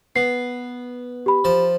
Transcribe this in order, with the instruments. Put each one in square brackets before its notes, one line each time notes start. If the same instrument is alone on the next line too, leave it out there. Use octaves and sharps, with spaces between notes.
[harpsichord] B3 [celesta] C7
[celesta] G4 B5
[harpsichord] F3 A5